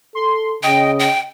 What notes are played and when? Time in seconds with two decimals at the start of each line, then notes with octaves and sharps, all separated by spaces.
0.15 A4 C6
0.63 C#3 D#5 G5
0.99 G5